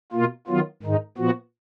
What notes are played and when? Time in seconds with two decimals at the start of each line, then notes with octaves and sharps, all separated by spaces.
0.12 B2 A#3 F4
0.47 D#3 F#3 B3 F4
0.83 G#2 D#3 G#3 D#4
1.18 A#2 F3 B3 F#4